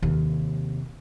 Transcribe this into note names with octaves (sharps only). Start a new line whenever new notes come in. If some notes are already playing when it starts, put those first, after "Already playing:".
D#2 C3